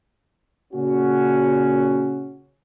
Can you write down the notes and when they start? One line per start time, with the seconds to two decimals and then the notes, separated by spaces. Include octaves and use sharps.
0.73 A#2 C#3 C#4 F#4